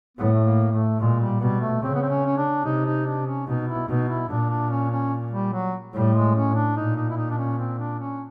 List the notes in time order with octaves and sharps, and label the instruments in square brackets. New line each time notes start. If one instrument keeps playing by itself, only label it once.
[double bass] A2 [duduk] B3
[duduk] A3
A#3
A3
[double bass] A#2 [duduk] G#3
[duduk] G3
[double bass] B2 [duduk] G3
[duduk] A3
[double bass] C#3 [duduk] C4
[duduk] B3
C4
C#4
C#4
D4
[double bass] C3 [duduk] D#4
[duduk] D#4
D4
C#4
[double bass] B2 [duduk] D#4
[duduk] E4
[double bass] B2 [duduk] D#4
[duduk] E4
[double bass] A#2 [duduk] D4
[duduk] D4
C#4
C#4
G3
F#3
[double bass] A2 [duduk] G3
[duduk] G#3
C#4
D4
[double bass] A#2 [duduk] D#4
[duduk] D#4
E4
D#4
D4
C#4
C4
D4
C#4